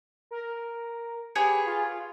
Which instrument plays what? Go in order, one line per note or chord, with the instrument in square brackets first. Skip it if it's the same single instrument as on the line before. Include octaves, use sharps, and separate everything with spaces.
[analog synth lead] A#4
[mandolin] B3 G#4 C#5 [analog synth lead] G4
[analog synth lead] F4